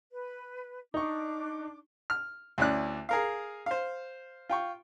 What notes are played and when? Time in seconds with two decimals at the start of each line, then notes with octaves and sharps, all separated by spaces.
0.12 B4
0.94 D4 D#4 C#6 D6
2.10 F6
2.58 D2 C#4 E4 D5 F#6
3.09 G#4 A#4 F5
3.66 C5 F5
4.49 F4 G5 C#6